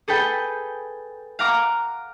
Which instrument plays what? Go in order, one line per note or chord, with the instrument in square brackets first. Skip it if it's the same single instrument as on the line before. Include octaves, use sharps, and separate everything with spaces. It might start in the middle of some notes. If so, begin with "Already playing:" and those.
[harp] G#4 A4 B4 G5
F5 F#5 A#5 D6